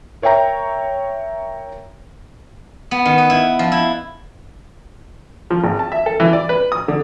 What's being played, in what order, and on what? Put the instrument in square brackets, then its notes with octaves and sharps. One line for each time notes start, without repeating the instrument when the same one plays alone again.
[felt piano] A#4 C#5 E5 G5 A#5
[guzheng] B3
D#3
B4
E4
F3
E4
[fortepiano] F3
G#1
A5
E5
A4
E3
D5
B4
D#6
D3